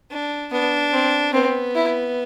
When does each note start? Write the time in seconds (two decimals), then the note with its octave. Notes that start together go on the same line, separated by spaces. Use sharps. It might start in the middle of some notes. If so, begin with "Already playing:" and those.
0.10 D4
0.52 B3 D4
0.93 C4
1.33 B3 C4
1.75 E4